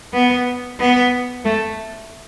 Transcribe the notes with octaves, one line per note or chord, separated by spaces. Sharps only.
B3
B3
A3